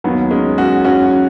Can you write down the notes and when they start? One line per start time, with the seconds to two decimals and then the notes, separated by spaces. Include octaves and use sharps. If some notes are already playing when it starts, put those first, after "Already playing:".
0.04 D#2 D#3 F#3 B3
0.31 G#3 C#4
0.58 C#4 F#4
0.85 C#4 F#4